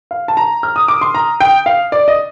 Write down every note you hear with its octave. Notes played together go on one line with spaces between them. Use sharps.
F5
A5
A#5
F6
D#6
D6
C6
A#5
G5
F5
D5
D#5